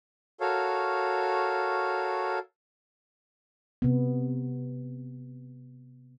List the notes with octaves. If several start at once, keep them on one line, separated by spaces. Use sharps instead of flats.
F#4 A4 A#4 C#5 F5
C3 B3